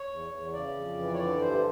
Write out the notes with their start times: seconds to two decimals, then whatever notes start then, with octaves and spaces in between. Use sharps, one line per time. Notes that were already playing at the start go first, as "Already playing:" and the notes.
Already playing: C#5
0.10 E2
0.31 E2
0.53 C#3 D5
0.75 F2
0.97 E3
1.14 C#5
1.19 D3 D5
1.40 G2 C5